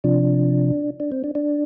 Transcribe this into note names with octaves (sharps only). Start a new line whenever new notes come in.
C3 F3 D4
D4
C4
D4
D4